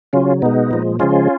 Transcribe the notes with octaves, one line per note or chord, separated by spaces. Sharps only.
C#3 F#3 C#4 F4
B2 G#3 B3 D#4
A#2 F3 G#3
C#3 F3 G#3 C#4 F4